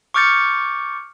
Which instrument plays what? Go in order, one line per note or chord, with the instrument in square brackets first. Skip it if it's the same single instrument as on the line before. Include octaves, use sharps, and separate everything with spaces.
[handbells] C#6 D6 F6 G6 A6 C#7